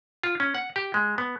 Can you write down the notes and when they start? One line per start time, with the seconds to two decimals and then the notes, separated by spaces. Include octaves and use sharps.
0.23 F4
0.40 C#4
0.55 F#5
0.76 G4
0.94 G#3
1.18 B3